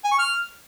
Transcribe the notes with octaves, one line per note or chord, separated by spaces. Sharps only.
G#5
C#6
F6